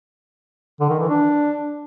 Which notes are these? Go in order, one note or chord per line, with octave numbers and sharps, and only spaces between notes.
D3
D#3
E3
D4